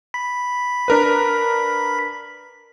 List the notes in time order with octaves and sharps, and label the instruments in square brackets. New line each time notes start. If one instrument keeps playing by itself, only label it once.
[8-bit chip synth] B5 B6
[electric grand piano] D4 A#4 B4